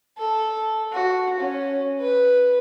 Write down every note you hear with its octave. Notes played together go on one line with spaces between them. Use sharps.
A4
F#4
C#4
B4